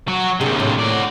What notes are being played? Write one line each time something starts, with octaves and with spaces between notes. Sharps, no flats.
F#3 F#4
D#2 C3 D4 G#4
A2
F#4 D5